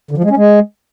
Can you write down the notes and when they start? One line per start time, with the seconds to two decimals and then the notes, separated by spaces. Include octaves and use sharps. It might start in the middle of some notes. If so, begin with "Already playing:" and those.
0.11 D3
0.17 F3
0.24 G#3
0.30 C#4
0.37 G#3